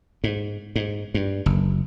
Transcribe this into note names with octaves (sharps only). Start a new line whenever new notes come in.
G#2
G#2
G2
F#1